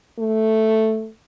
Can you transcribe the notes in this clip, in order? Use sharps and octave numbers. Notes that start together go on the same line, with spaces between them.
A3